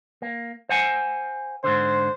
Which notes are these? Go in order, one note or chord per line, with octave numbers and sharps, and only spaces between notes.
A#3
C5 F#5 G#5
G#2 D3 C5